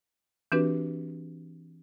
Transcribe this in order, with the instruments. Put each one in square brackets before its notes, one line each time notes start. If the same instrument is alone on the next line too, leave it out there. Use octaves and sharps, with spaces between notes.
[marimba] E3 C4 D4 F#4 G4 B4